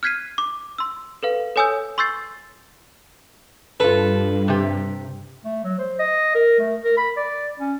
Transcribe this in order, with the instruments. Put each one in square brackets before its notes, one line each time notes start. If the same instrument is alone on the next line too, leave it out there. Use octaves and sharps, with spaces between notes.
[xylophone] F6 F#6 G#6 B6 C7 D#7
D6
C6 E6
A4 B4 F5
A4 C#5 G#5 D#6 E6 G6
C6 C#6 E6 G6 A6 C7
[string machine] G2 [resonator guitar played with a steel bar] F4 A4 [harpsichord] B4
[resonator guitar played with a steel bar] C3 G4
[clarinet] A3
F#3
C5
D#5
A#4
A3
A#4
B5
D5
C#4